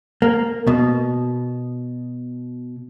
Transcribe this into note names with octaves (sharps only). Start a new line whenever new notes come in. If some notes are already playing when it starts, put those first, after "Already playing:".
A#3
B2